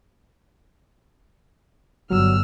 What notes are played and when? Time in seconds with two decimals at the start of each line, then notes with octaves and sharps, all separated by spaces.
2.10 G1 F#3 E6 F6